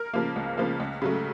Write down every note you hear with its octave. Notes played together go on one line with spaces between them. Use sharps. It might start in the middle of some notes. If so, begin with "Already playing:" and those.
Already playing: A#4
C#3 F3 A#3
C#2
C#3 F3 A#3
C#2
C#3 F#3 A3